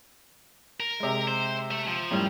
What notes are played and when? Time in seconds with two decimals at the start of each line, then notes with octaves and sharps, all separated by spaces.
0.80 A#4
1.00 C3 G#3
1.28 C5
1.71 A4 E5
1.88 F3
2.11 F#2 A2 G3